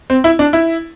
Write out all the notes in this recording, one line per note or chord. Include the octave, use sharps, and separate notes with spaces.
C4
E4
D4
E4